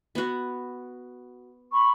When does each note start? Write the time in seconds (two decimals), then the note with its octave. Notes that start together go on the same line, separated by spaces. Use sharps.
0.15 B3 F#4
1.72 B5 C#6